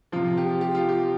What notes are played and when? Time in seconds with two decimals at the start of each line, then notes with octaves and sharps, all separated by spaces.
0.12 C3 F3 F4
0.37 G4
0.61 G4
0.75 F4
0.89 G4